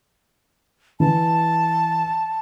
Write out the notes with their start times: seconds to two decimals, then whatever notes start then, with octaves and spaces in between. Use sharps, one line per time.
1.00 E3 A5